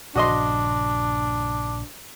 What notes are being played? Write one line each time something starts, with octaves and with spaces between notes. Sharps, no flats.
A#1 G2 C#3 D4 F#4 D#5 C6